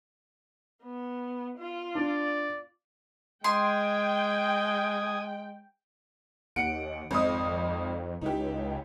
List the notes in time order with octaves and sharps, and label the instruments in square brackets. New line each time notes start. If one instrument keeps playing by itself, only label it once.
[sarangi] B3
F4
[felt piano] D4 [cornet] D5
[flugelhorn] G#3 [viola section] G5 [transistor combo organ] G#5 D#6 [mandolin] C6
[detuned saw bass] D#2 [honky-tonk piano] F#5 C#7 D7
[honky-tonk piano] G#1 D#5 D#6 [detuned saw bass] F2
[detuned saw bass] C#2 [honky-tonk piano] D#4 E4 G4